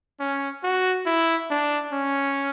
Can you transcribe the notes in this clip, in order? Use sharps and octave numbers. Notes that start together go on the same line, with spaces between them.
C#4
F#4
E4
D4
C#4